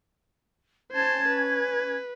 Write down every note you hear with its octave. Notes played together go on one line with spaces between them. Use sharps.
C#4 C5 A5 G#6
B4